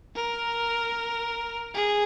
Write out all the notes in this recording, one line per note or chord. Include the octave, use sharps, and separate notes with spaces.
A#4
G#4